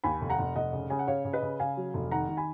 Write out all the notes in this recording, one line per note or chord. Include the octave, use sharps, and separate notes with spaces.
D#2 G#5 B5
F1
F#5 A#5
F1
F1 D#5 F#5
C#3
C#3 G#5
F#5
C#3 C#5 F5
C#3
B4 D#5
C#3
C#3 F5 G#5
F#3
F1
D#3 F#5 A#5
D#3
G#5 B5